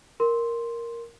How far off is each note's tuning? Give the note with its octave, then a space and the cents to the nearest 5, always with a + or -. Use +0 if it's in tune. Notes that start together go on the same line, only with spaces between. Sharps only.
A#4 +0 C6 +0